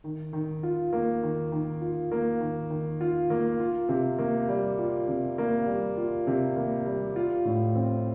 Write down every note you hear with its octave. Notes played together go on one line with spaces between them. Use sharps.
D#3
D#3
F4
A#3
D#3
D#3
F4
A#3
D#3
D#3
F4
A#3
F4
C3
A#3
G3
F4
C3
A#3
G3
F4
C3
A#3
G3
F4
A2
C4